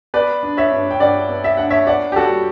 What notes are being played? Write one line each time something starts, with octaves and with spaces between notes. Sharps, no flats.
B3 B4 D5
D4
C#5 E5
G2
G5
G2 D5 F#5
B3
E5
D4 F#5
C#5 E5
B3 D5 F#5
G4
G3 F#4 A4